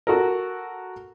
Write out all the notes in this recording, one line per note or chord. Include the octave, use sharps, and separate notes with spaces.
F#4 A4 A#4